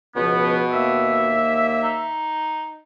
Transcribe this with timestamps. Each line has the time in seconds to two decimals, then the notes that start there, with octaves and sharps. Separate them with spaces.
0.16 C#2 B2 F3 B3
0.71 D#2 A#3 E5
1.83 D#4